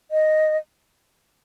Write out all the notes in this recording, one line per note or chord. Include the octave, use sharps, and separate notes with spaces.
D#5